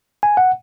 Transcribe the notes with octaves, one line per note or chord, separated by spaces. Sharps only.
G#5
F#5